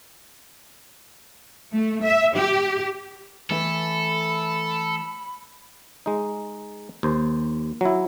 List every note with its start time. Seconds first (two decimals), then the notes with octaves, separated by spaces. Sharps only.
1.74 A3
2.03 E5
2.36 G4
3.50 E3 A3 A4 E5 B5
6.06 G#3 D#4
7.03 D#2 C5
7.81 F#3 E4